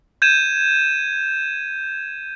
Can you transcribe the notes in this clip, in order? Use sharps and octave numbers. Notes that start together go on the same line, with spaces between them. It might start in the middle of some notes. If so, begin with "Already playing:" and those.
G6 G#6 D#7 E7